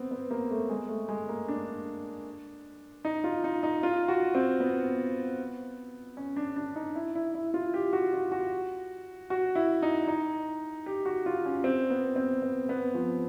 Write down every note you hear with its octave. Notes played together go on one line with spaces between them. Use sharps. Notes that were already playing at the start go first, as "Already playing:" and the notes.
Already playing: B3 C4
B3
A#3
A3
G#3
A3
G#3
A#3
D4
D#4
F4
D#4
D#4
F4
F#4
C4
B3
C#4
D4
D4
D#4
E4
E4
E4
F4
G4
F#4
F4
F#4
F#4
E4
D#4
D#4
G4
F#4
F4
C#4
C4
B3
C4
B3
B3
F3